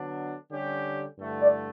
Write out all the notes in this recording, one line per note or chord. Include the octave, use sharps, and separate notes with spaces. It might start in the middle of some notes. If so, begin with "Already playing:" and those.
Already playing: D3 F#3 B3 D4
D3 G3 C#4 G4
G2 D3 A3 E4
D5